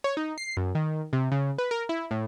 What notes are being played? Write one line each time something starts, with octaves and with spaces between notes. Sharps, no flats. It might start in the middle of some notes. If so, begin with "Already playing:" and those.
C#5
D#4
C7
F#2
D#3
C3
C#3
B4
A#4
E4
A2